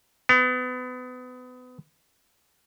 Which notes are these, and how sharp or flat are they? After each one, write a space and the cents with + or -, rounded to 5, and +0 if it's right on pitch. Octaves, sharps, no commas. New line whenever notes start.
B3 +30